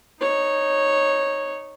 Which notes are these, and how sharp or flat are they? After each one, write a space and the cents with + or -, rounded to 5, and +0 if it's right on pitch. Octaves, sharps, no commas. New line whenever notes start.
D#4 -10 C#5 -10